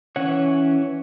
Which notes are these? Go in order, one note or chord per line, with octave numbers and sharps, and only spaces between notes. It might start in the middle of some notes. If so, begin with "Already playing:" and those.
E3 C#4 C#5 F#5